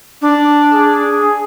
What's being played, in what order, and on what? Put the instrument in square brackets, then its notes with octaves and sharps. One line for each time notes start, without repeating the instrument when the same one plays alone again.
[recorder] D4
[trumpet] G#4